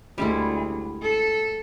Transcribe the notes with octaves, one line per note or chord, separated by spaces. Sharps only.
D2 G3 G#3 E4
A4